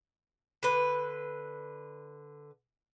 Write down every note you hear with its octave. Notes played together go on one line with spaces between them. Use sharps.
D3 B4